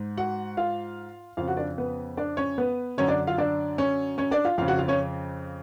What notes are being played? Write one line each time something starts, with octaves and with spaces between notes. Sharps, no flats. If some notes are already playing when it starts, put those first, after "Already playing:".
Already playing: G#2
F#4 F#5
F4 F5
F2 C#3 F4 F5
F#4 F#5
D4 D5
B3 B4
D4 D5
C#4 C#5
B3 B4
F#2 D3 C#4 C#5
D4 D5
F4 F5
D4 D5
C#4 C#5
C#4 C#5
D4 D5
F4 F5
F2 C#3 F4 F5
F#4 F#5
F4 F5
C#4 C#5